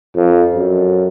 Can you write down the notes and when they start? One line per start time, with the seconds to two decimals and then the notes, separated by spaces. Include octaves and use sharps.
0.15 F2
0.55 F#2